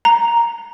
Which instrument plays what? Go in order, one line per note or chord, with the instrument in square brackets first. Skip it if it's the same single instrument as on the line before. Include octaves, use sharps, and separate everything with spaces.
[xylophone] A#5